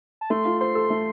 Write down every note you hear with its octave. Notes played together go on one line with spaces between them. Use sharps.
A5
A3 C6
F4
C5 C6
A4
A3